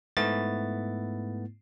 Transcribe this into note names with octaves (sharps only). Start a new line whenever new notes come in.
G#2 A3 B3 E4 A6